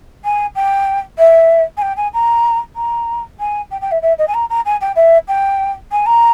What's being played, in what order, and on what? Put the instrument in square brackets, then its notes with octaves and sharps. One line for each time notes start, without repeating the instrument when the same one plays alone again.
[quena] G#5
G5
E5
G#5
G5
G#5
A#5
A#5
G#5
G5
G5
E5
E5
D#5
G#5
A#5
A#5
G#5
G5
E5
G5
G#5
A#5